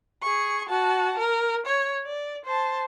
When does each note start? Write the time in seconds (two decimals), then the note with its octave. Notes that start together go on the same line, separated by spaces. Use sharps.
0.22 G#4 C#6
0.69 F#4 A5
1.18 A#4
1.66 C#5
2.06 D5
2.45 C5 A5